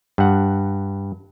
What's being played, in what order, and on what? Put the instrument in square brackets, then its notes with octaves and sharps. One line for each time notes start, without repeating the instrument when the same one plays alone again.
[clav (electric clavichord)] G2 F#5